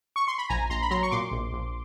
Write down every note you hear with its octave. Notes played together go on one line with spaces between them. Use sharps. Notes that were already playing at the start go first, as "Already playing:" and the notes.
C#6
C6
B5
A#1 G#5 A#5
A#1 A#5 C6
B5
F#3 A#5 C6
C#6
A#2 C6 D6
A#1
A#1